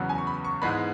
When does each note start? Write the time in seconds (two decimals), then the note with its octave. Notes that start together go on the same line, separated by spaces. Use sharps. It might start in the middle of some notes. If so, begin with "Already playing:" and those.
Already playing: E2 C#3 F#3 B3
0.09 G#5
0.18 C#6
0.27 B5
0.44 C#6
0.62 G#2 E3 G#3 B3 B5